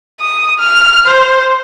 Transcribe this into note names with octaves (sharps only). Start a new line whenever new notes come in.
D#6
F6
C5